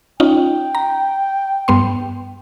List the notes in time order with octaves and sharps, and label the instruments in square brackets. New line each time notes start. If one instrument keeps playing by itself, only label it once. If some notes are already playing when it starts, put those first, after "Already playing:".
[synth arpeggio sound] C#4 D#4 F4 [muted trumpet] G5
[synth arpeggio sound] A#5
G2 B3 C6